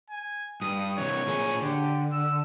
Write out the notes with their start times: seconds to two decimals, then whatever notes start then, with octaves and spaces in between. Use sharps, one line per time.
0.10 G#5
0.62 G2 D#6
0.98 C3 E3 C#5
1.27 A#2 G#4
1.61 D3 G4
2.12 E6